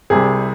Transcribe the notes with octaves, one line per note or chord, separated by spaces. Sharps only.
C2 C3 G3 G#4